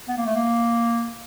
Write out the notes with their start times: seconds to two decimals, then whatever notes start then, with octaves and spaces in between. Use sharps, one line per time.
0.08 B3
0.17 A#3
0.26 A3
0.35 A#3